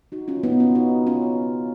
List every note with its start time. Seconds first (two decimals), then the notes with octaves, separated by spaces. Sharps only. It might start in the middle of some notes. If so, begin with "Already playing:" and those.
0.12 D#4 F#4
0.28 C#4 F4
0.43 B3 D#4
0.60 C#4 F4
0.75 D#4 F#4
1.07 C#4 F4